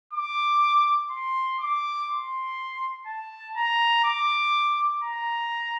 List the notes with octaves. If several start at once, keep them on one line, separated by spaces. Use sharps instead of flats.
D6
C6
D6
C6
A5
A#5
D6
A#5